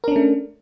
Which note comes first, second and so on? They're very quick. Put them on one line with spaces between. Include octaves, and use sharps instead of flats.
A#4 D4 C#4 A3